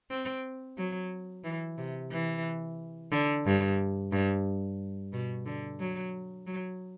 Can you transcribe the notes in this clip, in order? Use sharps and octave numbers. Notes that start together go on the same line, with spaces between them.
C4
F#3
E3
C3
E3
D3
G2
G2
B2
D3
F#3
F#3